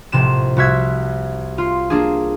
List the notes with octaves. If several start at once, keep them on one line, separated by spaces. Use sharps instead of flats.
A#1 A2 C3 E7
C2 F#4 E5 G#6
F4
A#3 D4 G#4